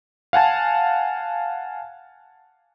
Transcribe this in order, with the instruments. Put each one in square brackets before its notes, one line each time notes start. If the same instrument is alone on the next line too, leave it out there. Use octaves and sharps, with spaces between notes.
[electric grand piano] F5 F#5 G#5 A5